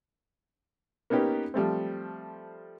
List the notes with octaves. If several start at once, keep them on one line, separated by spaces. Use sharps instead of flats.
A#3 B3 C#4 D#4 G4
F3 G3 A3 C4